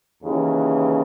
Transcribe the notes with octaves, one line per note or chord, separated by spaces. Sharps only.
D#2 C#3 E3